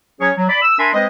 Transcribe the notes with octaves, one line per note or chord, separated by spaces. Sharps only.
F#3 C#4 G#4 C#5
F#3
D5 B5
E6
D4 A#4 E5 G#5 B5 C6
G#3 C4 B4 C5 D#5